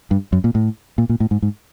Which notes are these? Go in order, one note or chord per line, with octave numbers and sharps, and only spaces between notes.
G2
F#2
A#2
A2
A#2
A#2
A2
G#2
G#2